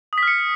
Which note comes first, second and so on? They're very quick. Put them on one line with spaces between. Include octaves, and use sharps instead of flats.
D#6 B6 F6 C#7